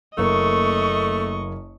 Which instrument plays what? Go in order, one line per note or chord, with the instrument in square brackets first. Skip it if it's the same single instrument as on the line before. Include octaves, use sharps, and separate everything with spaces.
[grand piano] F#1 A#3 [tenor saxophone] A3 [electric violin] D#5 C#6